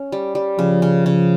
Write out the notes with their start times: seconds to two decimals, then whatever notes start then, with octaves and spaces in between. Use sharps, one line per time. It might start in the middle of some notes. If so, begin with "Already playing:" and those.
Already playing: C#4
0.12 G3
0.35 G3
0.59 C#3 F3
0.82 C#3
1.06 C#3